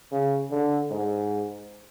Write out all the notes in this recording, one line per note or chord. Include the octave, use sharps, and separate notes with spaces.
C#3
D3
G#2